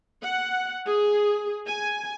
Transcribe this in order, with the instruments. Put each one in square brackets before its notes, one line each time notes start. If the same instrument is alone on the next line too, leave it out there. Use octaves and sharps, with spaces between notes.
[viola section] F#5
G#4
G#5